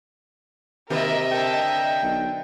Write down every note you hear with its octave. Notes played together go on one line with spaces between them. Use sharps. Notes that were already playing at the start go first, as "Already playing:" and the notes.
C3 D#3 A#3 F#4 A#4 D#5 E5
D3 A4 G5
B1